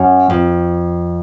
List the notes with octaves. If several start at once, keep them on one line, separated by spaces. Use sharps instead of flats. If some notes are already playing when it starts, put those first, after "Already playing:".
Already playing: F#2
F2